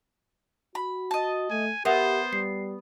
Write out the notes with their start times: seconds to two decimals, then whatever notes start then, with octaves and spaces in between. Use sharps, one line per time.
0.75 F#4 B5
1.11 D#5 A5
1.50 A3 G#5
1.85 B3 G4 A#4 C5 E5 F#5
2.33 G3 C7